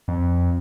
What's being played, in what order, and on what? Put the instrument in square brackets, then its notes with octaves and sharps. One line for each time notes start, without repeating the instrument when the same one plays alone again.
[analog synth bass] F2